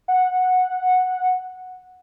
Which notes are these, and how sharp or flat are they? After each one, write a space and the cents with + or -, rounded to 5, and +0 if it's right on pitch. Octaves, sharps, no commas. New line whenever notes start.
F#5 -10